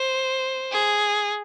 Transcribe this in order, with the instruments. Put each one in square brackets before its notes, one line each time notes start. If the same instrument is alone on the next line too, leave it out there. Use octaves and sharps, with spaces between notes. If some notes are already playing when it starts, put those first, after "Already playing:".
Already playing: [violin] C5
G#4